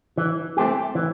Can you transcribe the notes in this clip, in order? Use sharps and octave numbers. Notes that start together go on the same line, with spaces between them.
E3
A3 C4 G4
E3